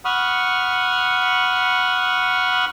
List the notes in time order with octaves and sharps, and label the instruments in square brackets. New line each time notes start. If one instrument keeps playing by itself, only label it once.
[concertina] F#5 B5 C#6 D#6 F6